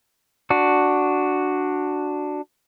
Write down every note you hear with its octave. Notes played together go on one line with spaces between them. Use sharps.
D4 F#4